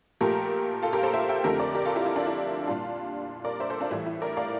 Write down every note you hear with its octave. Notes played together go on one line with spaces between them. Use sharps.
A#2 F3 A3 G4 A#4
F4 A4
G4 A#4
A4 C5
C5 E5
E5 G5
F2 D3 A3 G4 A#4
A#4 D5
G4 A#4
F4 A4
E4 G4
E4
D4
E4
A#2 G3 D4 F4
A#4 D5
C5 E5
A4 C5
D4 F4
A2 E3 G3 E4
E4
A#4 D5
D5 F5